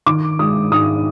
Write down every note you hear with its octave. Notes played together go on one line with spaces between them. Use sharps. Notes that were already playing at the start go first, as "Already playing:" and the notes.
D#3 D6
G#3 D#6
G#2 D#6